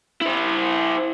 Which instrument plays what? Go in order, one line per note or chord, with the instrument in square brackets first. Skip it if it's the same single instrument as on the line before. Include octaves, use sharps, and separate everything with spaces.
[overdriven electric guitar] E4 C5